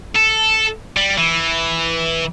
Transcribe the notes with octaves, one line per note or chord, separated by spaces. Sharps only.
A4
G3
E3